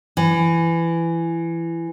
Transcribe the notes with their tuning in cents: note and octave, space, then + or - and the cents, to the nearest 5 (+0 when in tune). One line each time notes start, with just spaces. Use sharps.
E3 +20